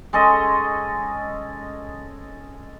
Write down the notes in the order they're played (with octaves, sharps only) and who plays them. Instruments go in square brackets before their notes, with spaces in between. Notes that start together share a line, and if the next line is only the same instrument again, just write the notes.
[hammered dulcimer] G#3 C#4 A4 D#5